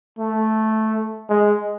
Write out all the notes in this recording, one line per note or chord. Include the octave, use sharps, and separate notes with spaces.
A3
G#3